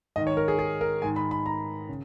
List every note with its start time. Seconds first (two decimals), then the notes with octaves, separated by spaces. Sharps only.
0.16 G#2 D#3 D#5
0.27 C#5
0.37 A#4
0.48 G#4
0.59 G#4
0.81 A#4
1.02 G#2 D#3 G#5
1.16 B5
1.31 B5
1.46 A#5
1.89 C#3